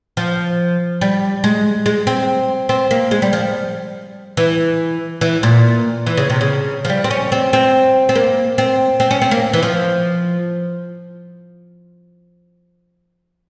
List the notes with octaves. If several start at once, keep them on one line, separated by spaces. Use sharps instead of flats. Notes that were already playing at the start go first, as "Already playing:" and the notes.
F3
G3
G#3
G#3
C4
C4
A#3
G#3
G3
F3
E3
E3
A#2
E3
C#3
C3
C#3
F3
G3
C4
C#4
C4
C4
C4
A#3
C4
C4
C#4
C4
A#3
E3
F3